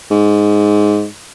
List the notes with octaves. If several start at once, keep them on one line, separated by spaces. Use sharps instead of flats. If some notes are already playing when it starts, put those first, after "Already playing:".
G#2